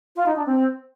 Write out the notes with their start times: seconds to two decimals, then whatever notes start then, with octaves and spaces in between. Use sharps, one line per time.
0.16 F4
0.26 D#4
0.36 D4
0.46 C4